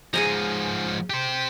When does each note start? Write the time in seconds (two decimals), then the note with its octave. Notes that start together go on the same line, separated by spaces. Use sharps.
0.14 G#2 F3 G#4 G#5 A#5
1.10 G4 C5